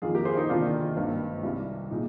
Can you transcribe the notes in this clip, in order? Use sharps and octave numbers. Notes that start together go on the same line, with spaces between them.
F2 D#3 A#3 F4 G#4
G4 A#4
G#4 C5
D#4 G4
D2 C3 D#3 A#3 D4 F4
G#1 G2 D#3 A#3
C2 C3 G3
A#2 G#3 D#4